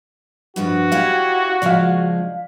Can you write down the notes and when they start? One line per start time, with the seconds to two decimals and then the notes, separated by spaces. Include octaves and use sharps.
0.56 G2 F3 F4 F#4
0.92 C#4 E4 G4 F5
1.62 C#3 F3 G#3 D5 F5